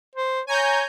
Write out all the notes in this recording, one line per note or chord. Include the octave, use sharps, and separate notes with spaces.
C5
C#5 G#5 A#5 G6